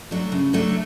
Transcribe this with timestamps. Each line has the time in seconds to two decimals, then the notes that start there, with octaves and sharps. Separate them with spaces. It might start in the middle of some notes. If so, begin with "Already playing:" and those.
0.11 F#3 A3 D4
0.32 C#3
0.53 F#3 A3 D4